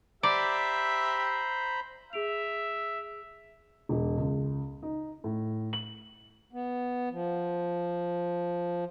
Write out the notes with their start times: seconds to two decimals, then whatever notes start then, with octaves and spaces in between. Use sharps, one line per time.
0.23 G4 C5 D5 E5 A#5 B5
2.13 G#4 E5 D7 F7
3.89 E1
4.18 C#2
4.82 D#4
5.24 A2
5.73 F#7
6.53 B3
7.11 F3